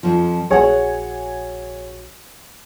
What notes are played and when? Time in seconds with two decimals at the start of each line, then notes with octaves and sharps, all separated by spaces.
0.03 F2 F3
0.50 A#1 F#4 G#4 C#5 F#5 G#5